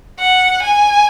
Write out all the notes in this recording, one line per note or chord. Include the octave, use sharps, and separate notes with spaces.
F#5
G#5